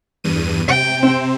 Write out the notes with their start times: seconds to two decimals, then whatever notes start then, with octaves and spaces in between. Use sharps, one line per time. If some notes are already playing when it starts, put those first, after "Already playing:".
0.24 E2 G2 D#7
0.68 C3 G5
1.03 C4